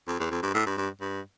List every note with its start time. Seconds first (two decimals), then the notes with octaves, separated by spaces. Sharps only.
0.08 F2
0.20 E2
0.31 F2
0.43 G2
0.54 A2
0.66 G2
0.78 G2
1.01 G2